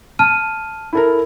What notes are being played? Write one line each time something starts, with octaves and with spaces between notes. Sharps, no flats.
A5 F6 D#7
E4 A4 A#4